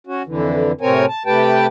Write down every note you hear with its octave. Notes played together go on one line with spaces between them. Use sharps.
C#4 F#4
F2 D3 E3
A2 C3 C4 A#4 C#5 G#5
A5
C3 A3 G4 B4 G5 A5